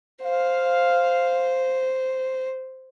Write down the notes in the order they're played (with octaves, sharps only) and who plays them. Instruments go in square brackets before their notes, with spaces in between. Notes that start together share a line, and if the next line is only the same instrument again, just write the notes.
[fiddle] C5 [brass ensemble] F5